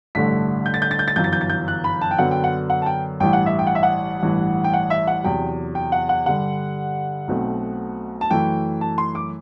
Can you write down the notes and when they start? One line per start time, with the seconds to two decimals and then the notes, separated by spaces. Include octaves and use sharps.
0.15 A1 G2 D3 A3 B6
0.66 G6
0.74 A6
0.82 G6
0.91 A6
0.99 G6
1.08 A6
1.16 G1 F#2 E3 G6
1.24 A6
1.33 G6
1.41 A6
1.50 G6
1.68 F#6
1.84 B5
2.01 A5
2.11 G5
2.18 F#2 D3 F#3 B3 F#5
2.31 G5
2.44 F#5
2.70 F#5
2.82 A5
2.86 G5
3.20 A1 G2 E3 G5
3.33 F#5
3.46 E5
3.59 G5
3.67 F#5
3.75 E5
3.83 F#5
4.23 A1 G2 E3
4.64 G5
4.73 F#5
4.90 E5
5.07 F#5
5.24 E2 C3 F#3 G5
5.75 G5
5.92 F#5
6.09 F#5
6.26 G2 D3 G3 F#5
7.28 B1 B2 A3 C4
8.21 A5
8.30 F#2 E3 A3 G5
8.81 A5
8.98 C6
9.15 D6